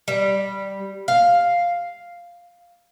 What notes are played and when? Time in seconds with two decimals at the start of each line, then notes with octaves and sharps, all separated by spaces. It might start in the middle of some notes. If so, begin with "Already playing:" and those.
0.08 G3
1.08 F5